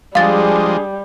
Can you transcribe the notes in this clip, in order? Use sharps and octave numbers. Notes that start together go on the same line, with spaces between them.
F3 G3 G#3 D4 G#4 F5 A6